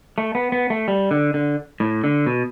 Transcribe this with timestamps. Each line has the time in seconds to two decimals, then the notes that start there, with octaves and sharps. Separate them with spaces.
0.18 A3
0.35 B3
0.52 B3
0.70 A3
0.88 G3
1.11 D3
1.34 D3
1.80 A2
2.04 D3
2.26 B2